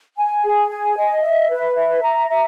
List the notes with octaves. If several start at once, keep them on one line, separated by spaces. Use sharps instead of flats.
G#5
G#4
G#5
D#5
E5
B4
E5
A#5
E5